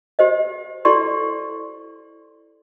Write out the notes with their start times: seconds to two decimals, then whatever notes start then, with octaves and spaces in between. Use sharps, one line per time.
0.19 G4 C5 D#5
0.85 E4 G4 A4 D5 C6 C#6